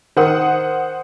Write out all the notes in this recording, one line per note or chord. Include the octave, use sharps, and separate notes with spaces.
D#3 C5 F#5 D#6